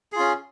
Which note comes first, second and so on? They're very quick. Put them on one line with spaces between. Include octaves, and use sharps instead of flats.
G#4 F4 C#4